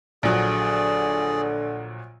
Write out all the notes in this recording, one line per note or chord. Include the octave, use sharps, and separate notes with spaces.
A#1 A#2 D3 F#3 G#4 D5